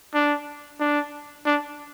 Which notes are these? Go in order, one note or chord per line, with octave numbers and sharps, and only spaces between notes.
D4
D4
D4